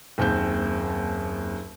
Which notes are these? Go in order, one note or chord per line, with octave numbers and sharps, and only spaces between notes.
F#1 D#2 C4 G6